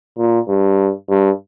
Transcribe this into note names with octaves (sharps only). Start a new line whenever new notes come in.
A#2
G2
G2